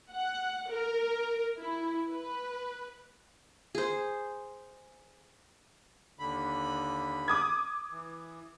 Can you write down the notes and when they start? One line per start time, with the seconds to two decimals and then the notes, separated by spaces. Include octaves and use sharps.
0.11 F#5
0.69 A#4
1.58 E4
2.09 B4
3.75 G#4 C5
6.19 D#2 D3 B5
7.28 D6 D#6 G#6
7.91 E3